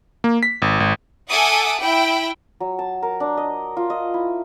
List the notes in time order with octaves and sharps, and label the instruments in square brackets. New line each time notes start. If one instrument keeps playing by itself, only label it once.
[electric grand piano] A#3
B6
G#1
G#1
[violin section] A4 E5 F#5 G#5 D6 D#6
E4 G5
[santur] F#3
A5
A#4
D4
D#5
F4
D#5
E4